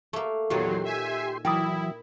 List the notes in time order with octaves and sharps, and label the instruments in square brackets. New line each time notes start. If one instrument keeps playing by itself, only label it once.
[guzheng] A3 A#3
[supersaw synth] E2 F#3 [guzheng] A#2 D#3 C#5 [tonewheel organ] G4 C6
[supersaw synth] E5 G#5
[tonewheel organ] E3 F#3 [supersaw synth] E4 [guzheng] A#4 D5 [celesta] G5 D#6